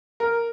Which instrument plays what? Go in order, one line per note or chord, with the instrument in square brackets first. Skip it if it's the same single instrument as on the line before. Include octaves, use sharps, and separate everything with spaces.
[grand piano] A#4